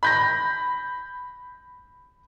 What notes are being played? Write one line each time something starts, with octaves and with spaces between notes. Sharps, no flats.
B5 G6 A#6